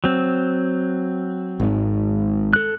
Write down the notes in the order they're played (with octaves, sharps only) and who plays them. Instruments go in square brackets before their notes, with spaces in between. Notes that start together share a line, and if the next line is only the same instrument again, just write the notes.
[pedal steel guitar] F#3 C4
[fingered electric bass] G#1 G#2
[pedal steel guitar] A4 F#6